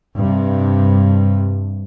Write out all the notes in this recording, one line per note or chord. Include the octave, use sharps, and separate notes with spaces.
G2 C3